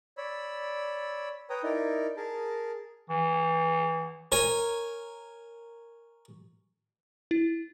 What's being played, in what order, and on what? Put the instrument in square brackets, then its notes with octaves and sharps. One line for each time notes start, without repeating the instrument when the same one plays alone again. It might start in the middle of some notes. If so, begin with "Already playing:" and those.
[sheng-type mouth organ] C#5 D5 B5 E6
B4 C#5 G5 A#5 D#6
D#4 E4 A#4 D5
G#4 A#4 A5
[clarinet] E3
[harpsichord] A#4 C#5 G#5
[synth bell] E4